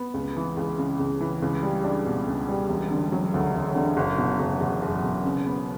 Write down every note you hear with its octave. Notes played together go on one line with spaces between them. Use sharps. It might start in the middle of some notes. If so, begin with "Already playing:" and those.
Already playing: B3
C#2
E3
C#2
C#3
C#2
E3
C#2
G3
D4
B2
C#2
G3
E1
D3
F#3
D2
E1
D3
F#1
B2
F#1
E2
F#1
B2
C#3
B3